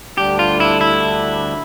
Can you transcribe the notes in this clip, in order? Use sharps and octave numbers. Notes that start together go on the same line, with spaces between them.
D2 D3 G3 D4 G4
F4
E4
E4